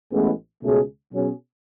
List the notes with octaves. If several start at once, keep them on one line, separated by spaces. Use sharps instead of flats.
A1 A2 G#3 B3
C#2 B2 A3 C#4 G#4
B2 F#3 C#4 G#4